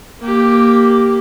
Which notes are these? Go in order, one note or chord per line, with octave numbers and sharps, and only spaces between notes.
A#3 G4